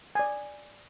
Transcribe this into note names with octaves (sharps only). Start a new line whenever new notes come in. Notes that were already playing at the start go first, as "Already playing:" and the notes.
D5 G#5